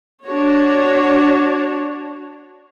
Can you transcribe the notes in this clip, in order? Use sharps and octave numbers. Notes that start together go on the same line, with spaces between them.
D4 F#4 C#5